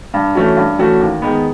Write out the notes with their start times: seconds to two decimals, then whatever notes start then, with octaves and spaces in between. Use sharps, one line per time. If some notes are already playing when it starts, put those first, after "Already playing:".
0.14 G2
0.35 E3 A3 C#4 F#4
0.57 G2
0.79 E3 A3 C#4 F#4
1.00 D#2
1.22 D#3 G#3 B3